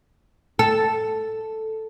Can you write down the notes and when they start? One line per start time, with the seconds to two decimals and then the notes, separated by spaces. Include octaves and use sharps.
0.59 A4